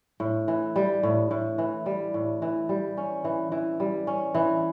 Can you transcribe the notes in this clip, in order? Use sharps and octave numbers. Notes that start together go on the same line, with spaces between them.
A2
E3
G3
A2
A2
E3
G3
A2
E3
G3
C#4
E3
E3
G3
C#4
E3